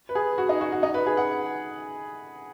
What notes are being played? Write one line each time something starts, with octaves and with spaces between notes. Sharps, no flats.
B4
G#4
F#4
D#4
F#4
F#4
D#4
B4
G#4
F#5